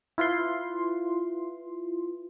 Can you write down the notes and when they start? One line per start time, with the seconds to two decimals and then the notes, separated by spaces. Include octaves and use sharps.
0.18 E4 F4 B4 C6